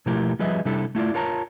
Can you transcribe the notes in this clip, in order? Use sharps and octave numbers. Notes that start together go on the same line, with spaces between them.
B2 F3 A3 E4 G4 A#4
F3 G3 G#4 B4 D#5 E5
C3 G3 D4 E4 A4
A3 E4 F4 D5
F4 A#4 C#5 A5 A#5